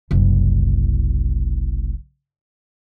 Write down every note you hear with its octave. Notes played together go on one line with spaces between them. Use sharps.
F#1 C2